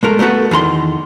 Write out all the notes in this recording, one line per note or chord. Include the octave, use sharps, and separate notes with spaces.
G#3 A3 A#4
G3 A3 B3 F#4 A4
E2 D#3 A#5 C6